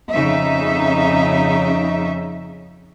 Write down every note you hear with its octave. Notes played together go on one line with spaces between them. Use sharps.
F2 C#3 D#4 E5